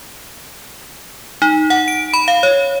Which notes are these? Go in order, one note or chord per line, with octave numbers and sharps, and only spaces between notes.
D#4
F#5
D7
B5
F5
C#5